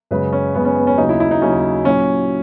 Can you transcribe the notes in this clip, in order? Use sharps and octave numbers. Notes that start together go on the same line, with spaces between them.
F#2 C#3 G#3 B4
C#4
F#2 C#3 G#3 B3
C#4
B3
C#4
D#2 C#3 F#3 D#4
E4
E4
D#4
D#2 C#3 F#3 C#4
A#2 F#3 C#4